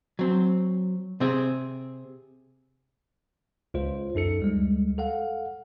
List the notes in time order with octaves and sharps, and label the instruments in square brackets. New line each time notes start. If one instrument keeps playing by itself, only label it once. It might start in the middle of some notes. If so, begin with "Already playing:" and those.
[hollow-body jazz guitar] F#3 C4
C3 C4 G#4
[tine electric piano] C#2 F4 C5
F#2 D#4 A4 C#7
D2 G3 G#3
A4 F5 F#5